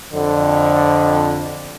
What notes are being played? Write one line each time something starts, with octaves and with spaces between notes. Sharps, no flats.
F2 D3